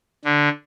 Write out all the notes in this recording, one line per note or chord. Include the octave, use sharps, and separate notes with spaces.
D3